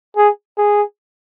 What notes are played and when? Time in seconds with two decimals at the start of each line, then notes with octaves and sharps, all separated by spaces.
0.17 G#4
0.58 G#4